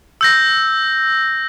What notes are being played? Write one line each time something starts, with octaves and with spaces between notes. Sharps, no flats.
E6 G6 A#6